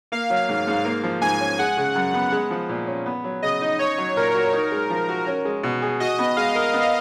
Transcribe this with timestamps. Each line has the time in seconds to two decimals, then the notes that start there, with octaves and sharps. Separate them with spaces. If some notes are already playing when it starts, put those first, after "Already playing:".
0.12 A#3 F5
0.30 F#3
0.49 G#2
0.67 G#2
0.85 A#3
1.03 F3
1.22 G#2 G#5
1.40 C#4
1.59 G#3 F#5
1.77 C#3
1.96 F#2
2.14 B3
2.32 G#3
2.51 F3
2.69 A#2
2.87 C#4
3.06 B3
3.24 F#3
3.42 C#3 D#5
3.61 D#4
3.79 C#4 C#5
3.98 F#3
4.16 A#2 A#4
4.34 F#4
4.53 D#4
4.72 G#3
4.90 F3
5.09 F#4
5.27 C#4
5.45 G#3
5.63 B2
5.82 G#4
6.00 F#4 D#5
6.19 B3
6.37 G#3 F5
6.55 A#4
6.74 B3